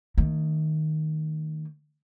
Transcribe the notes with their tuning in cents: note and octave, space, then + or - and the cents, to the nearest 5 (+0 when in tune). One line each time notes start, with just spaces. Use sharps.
D#3 +0 A3 +40